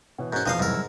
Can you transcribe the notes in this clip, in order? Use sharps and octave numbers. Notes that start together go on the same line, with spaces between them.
B2 E3 C#5 F#5
G#2 C#4 F#4 A#4 A#5 C#6 F#6 G6
F1 E2 B2 F3 D#5 F5
G#2 C3 F#3 G3 E4 A#4 E6 F6